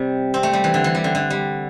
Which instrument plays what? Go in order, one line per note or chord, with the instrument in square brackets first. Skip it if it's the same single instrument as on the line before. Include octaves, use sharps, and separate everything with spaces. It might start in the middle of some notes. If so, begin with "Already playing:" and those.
Already playing: [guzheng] C3 G3
C4
A3
G3
E3
D3
E3
G3
D3
D3
G3